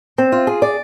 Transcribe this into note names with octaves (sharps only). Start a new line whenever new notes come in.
C4
F4
G#4
D5